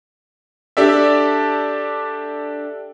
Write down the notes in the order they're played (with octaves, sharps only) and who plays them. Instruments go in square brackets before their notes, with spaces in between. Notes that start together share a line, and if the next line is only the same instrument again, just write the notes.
[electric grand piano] D4 G4 A4 D5 E5